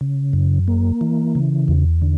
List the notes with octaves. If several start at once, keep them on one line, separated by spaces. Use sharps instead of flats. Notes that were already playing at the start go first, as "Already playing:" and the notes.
C#3
F#2
A#3
E3
C#3
E2
D3